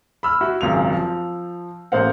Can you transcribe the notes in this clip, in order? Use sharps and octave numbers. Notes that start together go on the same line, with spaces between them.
B5 E6 F6
E4 F#4
G#1 C#2 F#2 F7
F3
A1 A2 A#3 C5 F5 F#5